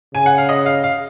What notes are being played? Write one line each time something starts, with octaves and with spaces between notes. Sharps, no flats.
C#3 G#5
F#5
F5
D#5
F5
F5